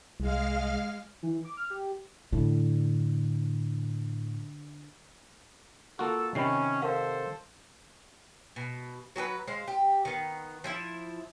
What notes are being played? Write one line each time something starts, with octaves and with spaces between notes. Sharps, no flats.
C2 G#3 F5 F6
E3
D6
F6
G4
A2 D3
A#3 F4 F#4 A4
C3 D#3 C#4 B5 C7
A4 A#4 C5 F5 F#5
B2
F#3 F#4 G#4 B4
G#3 C5 F5
G4
D#3 B3
F3 E4 E5